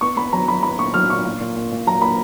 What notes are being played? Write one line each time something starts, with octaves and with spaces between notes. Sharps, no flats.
B3 C#6
B3 B5
F#3 A#5
F#3 B5
B3 B5
A#2 C#6
F#3 F6
A#2 C#6
A#2
A#2
A#2
A#2
F#3 A#5
A#3 B5